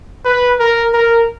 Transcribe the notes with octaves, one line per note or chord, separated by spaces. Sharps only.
B4
A#4
A#4